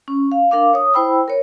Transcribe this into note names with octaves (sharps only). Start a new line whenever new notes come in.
C#4
F5
D4 A#4 F5 D6
C#5 D#6
E4 C5 G5 B5 E6
A#4 C#5